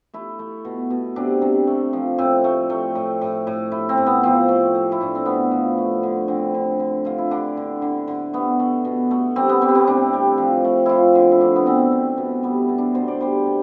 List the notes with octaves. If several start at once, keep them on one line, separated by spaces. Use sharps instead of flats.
A3 E4
A3
B2
B2
C3 D4
C3
A3
F3
A2 C4
A3
A3
A2
A2
A2
A3 E4
C4
A2
B3
F3 C4
A3
A3
E4
A2 D4
C4
A3 B3
F3
A3
D3
D3 C4
D3
D3
D3 F4
E4
D3 D4
D3
D3
D3
A3 B3
A3
B2
A3
G3 C4
B3
G3 C4
B3
C4
A2 D4
G3
F3
A3
F3 E4 F4
D3
E4
A3 D4
B3
B2 C4
A3
B2
G3 B3
B2
D4
B2 C5
D5
G3 C5
C3